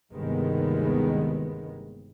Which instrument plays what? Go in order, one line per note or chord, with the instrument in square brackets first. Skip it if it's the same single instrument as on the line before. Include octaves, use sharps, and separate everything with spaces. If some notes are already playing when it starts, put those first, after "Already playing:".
[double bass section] G1 D#2 C3 D#3 G#3 B3